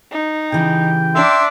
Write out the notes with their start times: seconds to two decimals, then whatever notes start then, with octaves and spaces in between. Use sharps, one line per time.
0.11 D#4
0.52 C#3 E3 G4 G5
1.15 D4 E5 C6 D6